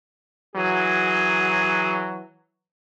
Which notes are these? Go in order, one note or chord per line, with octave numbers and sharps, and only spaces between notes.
E3 F#3 G#4